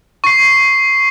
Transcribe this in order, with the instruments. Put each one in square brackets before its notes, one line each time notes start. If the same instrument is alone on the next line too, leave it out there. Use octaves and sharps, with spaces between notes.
[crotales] C#6 C7